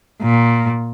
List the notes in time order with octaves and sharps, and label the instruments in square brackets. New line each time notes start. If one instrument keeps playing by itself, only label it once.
[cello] A#2